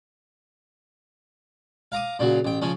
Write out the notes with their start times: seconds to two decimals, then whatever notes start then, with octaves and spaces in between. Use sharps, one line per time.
1.92 F5 A#5 D6 D#6
2.19 A#2 C#3 F#3
2.45 A1 G5
2.62 C#3 F3 C#4